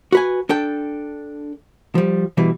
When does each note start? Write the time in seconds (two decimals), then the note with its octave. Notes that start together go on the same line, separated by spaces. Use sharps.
0.12 F#4 B4 G#5
0.49 D4 A4 G5
1.95 F3 G3
2.37 B2 E3 G3